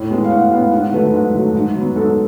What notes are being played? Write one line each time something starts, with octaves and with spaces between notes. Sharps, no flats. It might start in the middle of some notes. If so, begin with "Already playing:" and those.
Already playing: A2
G#3 B3
F5
A2 F#5
G#3 B3 F5
G#2 F#5
F#3 A3 B4
G#2
F#3 A3
G#2
F#3 B3
G#2 A4